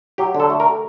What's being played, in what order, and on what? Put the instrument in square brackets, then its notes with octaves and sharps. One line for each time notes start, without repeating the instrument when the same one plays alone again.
[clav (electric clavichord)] F#3 G4
D3
A4
A3
A#4